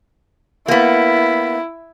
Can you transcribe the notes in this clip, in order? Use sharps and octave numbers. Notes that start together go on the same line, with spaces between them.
A#3 B3 E4